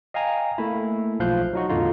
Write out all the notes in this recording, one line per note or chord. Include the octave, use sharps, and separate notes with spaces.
D#5 F5 G5 G#5 A#5
A3 A#3 E4
B1 F3 F5 F#6 G6
F#3 D#4 F#4
E2 A2 D3 D#4 F4